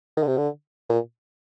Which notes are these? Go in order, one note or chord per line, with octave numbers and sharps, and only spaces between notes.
D#3
D3
C3
D3
A#2